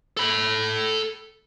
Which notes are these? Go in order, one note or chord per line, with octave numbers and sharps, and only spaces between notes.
A4 B5